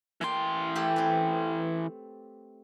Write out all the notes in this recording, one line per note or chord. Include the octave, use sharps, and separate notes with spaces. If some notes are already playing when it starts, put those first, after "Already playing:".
E3 A#3 D5 G5 C6
A3 G4 A4
C4 B4